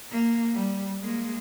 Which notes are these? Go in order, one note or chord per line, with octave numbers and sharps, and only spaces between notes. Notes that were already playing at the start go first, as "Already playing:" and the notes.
A#3
G3
G#3 A#3